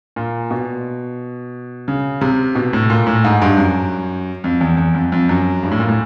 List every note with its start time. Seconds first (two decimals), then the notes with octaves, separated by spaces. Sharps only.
0.16 A#2
0.51 B2
1.88 C#3
2.21 C3
2.55 B2
2.73 A2
2.90 A#2
3.07 A2
3.24 G#2
3.42 G2
3.58 F#2
4.44 F2
4.61 E2
4.77 E2
4.94 F2
5.12 F2
5.29 F#2
5.63 G2
5.71 A2
5.79 A#2
5.89 A2